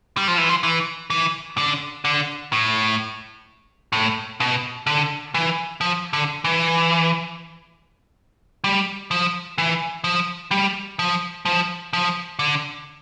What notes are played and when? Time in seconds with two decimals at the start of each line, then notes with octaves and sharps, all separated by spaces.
0.17 G3
0.28 F3
0.38 E3
0.49 F3
0.63 E3
1.10 E3
1.58 D3
2.05 D3
2.53 A2
3.93 A2
4.40 B2
4.87 D3
5.34 E3
5.81 F3
6.13 D3
6.44 E3
8.64 G3
9.11 F3
9.58 E3
10.04 F3
10.51 G3
10.99 F3
11.45 F3
11.93 F3
12.39 D3